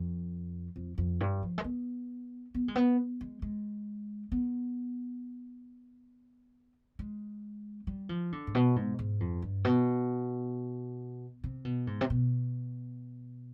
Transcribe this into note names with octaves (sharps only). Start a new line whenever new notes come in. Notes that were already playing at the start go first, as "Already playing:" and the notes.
Already playing: F2
F2
F2
G2
F3
G#3
B3
B3
G#3
B3
G#3
G#3
B3
G#3
G3
F3
D3
G#2
B2
G#2
G#2
F2
G2
B2
C3
B2
G#2
C3
B2